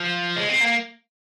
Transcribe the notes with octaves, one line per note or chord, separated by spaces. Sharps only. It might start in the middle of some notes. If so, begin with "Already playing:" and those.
Already playing: F3
G#3
C4
A#3